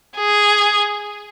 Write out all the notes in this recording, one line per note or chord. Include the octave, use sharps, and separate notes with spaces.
G#4